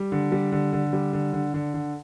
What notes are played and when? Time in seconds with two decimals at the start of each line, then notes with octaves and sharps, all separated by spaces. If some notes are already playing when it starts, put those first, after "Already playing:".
Already playing: G3
0.12 D3
0.32 G3
0.52 D3
0.73 D3
0.93 G3
1.13 D3
1.33 D3
1.54 D3
1.74 D3